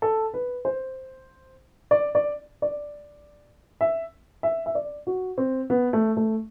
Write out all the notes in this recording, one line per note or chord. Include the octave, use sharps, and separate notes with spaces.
A4
B4
C5
D5
D5
D5
E5
E5
E5
D5
F#4
C4
B3
A3
A3